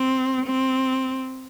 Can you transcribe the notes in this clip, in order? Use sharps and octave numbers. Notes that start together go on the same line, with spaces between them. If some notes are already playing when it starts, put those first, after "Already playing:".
Already playing: C4
C4